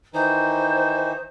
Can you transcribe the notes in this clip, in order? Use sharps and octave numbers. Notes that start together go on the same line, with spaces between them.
D#3 E3 D#4 C5